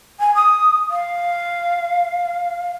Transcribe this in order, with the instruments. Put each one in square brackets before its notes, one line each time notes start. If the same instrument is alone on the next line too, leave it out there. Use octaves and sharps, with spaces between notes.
[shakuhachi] G#5
D#6
F5